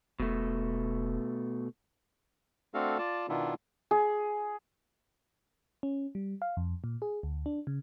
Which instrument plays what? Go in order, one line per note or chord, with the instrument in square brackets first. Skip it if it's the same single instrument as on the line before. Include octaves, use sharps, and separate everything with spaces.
[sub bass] E1 [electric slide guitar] B2 A3
[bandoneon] A3 C4 D4 F#4 A4 F5
F4 D5 A5
B2 D#3 B3 D4 E4 F4
[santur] G#4
[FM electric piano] C#4
G3
F5
F2
A#2
G#4
D2
D4
C#3